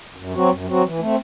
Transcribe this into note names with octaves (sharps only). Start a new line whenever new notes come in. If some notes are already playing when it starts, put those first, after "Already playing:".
F#2
F#3 C4 F#4
F#2
F#3 C4 F#4
E3
A3 C4